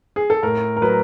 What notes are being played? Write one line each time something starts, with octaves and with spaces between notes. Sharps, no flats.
G#4
A4
A2 A#4
A#4
F#3 B4